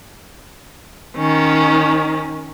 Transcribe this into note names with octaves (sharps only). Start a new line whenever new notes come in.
D#3 C#4